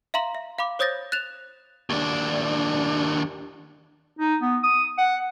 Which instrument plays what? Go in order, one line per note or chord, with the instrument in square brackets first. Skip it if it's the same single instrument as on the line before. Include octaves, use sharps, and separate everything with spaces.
[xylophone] E5 F5 A#5 C6 F#7
E5
F5 B5 D6
C5 C#5 D#6 G6 A6 A#6
F#6 A6 E7 F7
[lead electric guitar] D#2 D4
[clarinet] D#4
B3
D#6
F#5